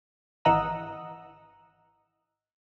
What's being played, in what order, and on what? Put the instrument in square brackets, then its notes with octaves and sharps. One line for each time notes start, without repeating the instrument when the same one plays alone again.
[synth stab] G#1 E3 D#5 F#5 A#5 E6